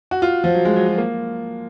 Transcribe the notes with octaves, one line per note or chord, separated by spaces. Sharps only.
F#4
F4
F3
F#3
G#3
F#3
F#3
A#3